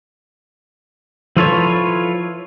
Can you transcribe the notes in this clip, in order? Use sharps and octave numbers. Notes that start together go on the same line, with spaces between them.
F3 E4 F4 A4 B4 C#5